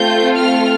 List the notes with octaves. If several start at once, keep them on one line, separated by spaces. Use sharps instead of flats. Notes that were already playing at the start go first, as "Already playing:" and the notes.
Already playing: A3 C4 F4 A4 G6
F6